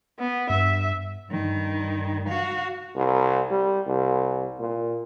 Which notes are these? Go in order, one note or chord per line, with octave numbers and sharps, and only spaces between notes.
B3
G2 E5
G2 D#3
F#4 F5
C2
G3
C2
A#2